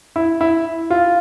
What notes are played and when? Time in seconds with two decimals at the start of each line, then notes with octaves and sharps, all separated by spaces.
0.16 E4
0.41 E4
0.90 F4